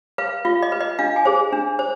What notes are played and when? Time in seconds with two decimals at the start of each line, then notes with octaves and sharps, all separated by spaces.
0.18 B4 F5
0.45 F4 F5
0.62 D#5
0.72 B4
0.81 D#5
0.99 D4 F5
1.16 G#5
1.25 G#4 C5
1.53 D4
1.79 C5